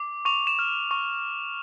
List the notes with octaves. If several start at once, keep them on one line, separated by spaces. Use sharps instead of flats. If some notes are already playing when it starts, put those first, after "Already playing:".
Already playing: D6
C#6 F7
E7
F6
C#6